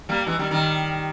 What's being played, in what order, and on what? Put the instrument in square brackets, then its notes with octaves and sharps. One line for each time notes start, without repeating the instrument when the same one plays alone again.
[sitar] G3 A#3
E3 G#3
D#3 G3
D#3 G3